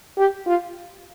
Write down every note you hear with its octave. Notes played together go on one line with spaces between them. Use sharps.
G4
F4